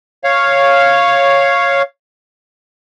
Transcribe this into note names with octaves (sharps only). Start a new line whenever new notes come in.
C#5 F5